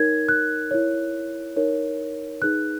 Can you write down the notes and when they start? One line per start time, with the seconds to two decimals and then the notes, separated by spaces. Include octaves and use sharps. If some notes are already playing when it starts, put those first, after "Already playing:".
Already playing: D#4 A#4 C#5 G#6
0.29 F#6
0.71 E4 A#4 C#5
1.56 D#4 A#4 C#5
2.41 D#4 G#4 B4 F#6